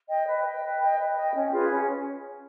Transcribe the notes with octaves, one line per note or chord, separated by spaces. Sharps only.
D#5 G5
B4
D#5 G5
B4
D#5 G5
B4
D#5 G5
C#4
F4 G#4 B4
C#4